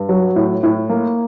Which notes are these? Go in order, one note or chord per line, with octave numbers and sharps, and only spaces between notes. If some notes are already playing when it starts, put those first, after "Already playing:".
Already playing: G2
F#3
A2
A2
A#3